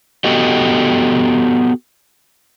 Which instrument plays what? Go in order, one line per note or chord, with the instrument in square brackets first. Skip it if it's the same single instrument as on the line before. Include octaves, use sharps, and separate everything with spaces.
[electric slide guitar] B3 F#4 G4 A4 D#5